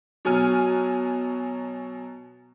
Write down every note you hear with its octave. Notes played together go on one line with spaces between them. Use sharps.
B2 F#3 G#5 F6